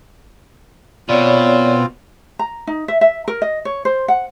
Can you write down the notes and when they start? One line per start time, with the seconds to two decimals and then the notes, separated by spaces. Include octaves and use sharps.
1.09 B2 C4 F4 C#5 D5
2.39 A#5
2.67 D#4
2.88 E5
3.01 E5
3.28 A#4
3.42 D#5
3.65 C#5
3.85 C5
4.08 F#5